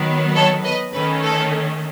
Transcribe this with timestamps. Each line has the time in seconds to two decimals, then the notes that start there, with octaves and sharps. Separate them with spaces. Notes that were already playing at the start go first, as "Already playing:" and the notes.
Already playing: D#3 F#3 B3
0.36 A4 C#5
0.64 B4 D#5
0.93 D#3 A3 C#4 B4
1.23 A4